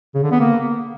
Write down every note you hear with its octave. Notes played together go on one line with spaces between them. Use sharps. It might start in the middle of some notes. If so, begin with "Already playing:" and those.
C#3
D3
B3
A#3